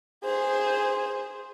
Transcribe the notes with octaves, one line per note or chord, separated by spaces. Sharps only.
G#4 C5